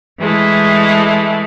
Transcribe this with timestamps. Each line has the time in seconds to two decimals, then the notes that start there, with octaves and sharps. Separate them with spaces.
0.20 E3 G#3 A3 E4